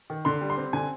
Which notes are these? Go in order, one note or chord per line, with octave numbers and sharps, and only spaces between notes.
D#3
D3 C6
G3
C6
C4
D3 G#5